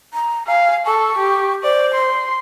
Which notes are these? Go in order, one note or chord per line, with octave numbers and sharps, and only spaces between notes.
A#5
F5 G#5
A4 C#6
G4
C5 D5
C6